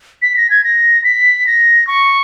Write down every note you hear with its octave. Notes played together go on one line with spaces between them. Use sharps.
B6
A#6
G#6
A#6
B6
A#6
C#6